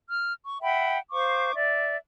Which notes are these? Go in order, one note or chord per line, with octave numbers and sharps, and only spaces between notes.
F6
C#6
E5 F#5 G5 B5
C5 F5 C#6 D6
D5 E5